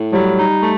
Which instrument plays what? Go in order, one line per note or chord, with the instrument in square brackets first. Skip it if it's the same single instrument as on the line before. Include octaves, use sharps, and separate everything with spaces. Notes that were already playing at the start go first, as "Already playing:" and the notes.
Already playing: [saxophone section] A2
[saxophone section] F#3 [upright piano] G3
[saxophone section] D#4
A3